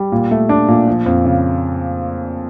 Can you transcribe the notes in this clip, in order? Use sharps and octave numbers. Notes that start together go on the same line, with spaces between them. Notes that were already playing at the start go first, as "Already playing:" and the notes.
Already playing: G3
A#2
A3
D4
A#2
F3
F2
C#3